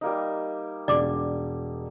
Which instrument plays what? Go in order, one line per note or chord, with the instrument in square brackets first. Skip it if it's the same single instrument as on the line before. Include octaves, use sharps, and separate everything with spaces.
[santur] G3 A#3 D#4
[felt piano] E1 [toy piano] D5 D6